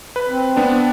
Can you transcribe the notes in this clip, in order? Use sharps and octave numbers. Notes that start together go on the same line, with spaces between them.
B4
C4
B3 D4